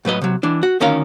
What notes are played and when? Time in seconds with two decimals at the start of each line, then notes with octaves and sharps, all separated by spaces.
0.05 A2 F#3 B4 D#5
0.21 C3 F#3
0.43 E3 D4
0.63 F#4
0.80 D2 D#3 C#4 A#4 F5